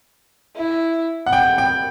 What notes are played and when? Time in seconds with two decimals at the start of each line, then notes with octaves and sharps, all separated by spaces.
0.56 E4
1.26 F#5
1.33 G5
1.58 G5